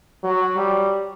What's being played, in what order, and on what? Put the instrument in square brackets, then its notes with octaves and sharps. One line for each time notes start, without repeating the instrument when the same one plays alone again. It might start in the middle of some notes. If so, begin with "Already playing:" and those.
[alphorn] F#3
G3